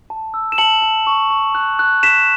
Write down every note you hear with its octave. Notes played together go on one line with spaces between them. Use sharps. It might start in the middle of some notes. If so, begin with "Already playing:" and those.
A5
E6
E7
A5 C#7 F#7
A5
C#6
C#6
F#6
F#6
F#6 B6 E7